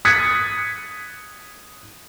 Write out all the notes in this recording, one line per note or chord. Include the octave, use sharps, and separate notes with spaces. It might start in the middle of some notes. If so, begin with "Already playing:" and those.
D#6 F#6 G#6 A6 B6 C#7